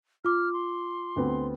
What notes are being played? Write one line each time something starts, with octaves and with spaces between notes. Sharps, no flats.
F4 D6 F6
C6
D2 B3 C4